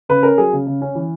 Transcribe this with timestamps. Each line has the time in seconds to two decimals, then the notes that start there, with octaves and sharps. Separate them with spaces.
0.09 C#3 B4
0.23 C#4 A#4
0.38 F#3 G#4
0.53 C#3
0.67 C#3
0.82 C#4
0.95 E3